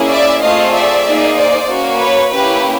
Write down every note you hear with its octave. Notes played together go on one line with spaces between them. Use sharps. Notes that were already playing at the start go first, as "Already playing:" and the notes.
Already playing: A#3 C#4 E4 G#4
D5 E5
A3 C4 F4 G#4 D#5 F5
D5 E5
A#3 D#4 G#4
C5 D5
A#3 C#4 F#4
B4 C#5
A#3 C#4 E4 G4 B4